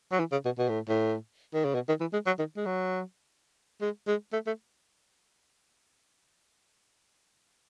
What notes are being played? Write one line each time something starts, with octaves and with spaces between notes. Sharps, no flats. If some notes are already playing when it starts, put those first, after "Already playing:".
F#3
E3
C#3
B2
B2
A2
A2
D#3
C#3
B2
D#3
E3
G#3
F#3
D#3
G#3
F#3
G#3
G#3
A3
A3